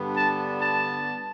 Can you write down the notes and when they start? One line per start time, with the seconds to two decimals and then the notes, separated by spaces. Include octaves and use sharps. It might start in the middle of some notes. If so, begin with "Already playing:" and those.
Already playing: G2 D3 B3 D4
0.16 A5
0.62 A5